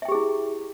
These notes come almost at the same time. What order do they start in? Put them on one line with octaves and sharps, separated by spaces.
E5 G5 G4 G#4 E4